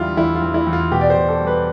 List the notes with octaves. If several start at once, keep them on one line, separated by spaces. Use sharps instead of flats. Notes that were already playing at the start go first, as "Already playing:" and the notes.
Already playing: E2 D3 G3 E4 F4
E2 E4
F4
E2
E4
E2
F4
B2 G4
D5
C5
B2
A4
G3
B4